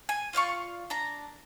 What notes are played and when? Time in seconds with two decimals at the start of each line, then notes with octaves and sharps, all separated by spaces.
0.09 G#5
0.33 F4 D5 F5 C#6
0.90 D4 A#5